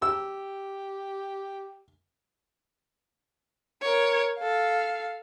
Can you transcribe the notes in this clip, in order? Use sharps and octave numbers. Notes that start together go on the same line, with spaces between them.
G4 E6
A#4 C#5
A4 F5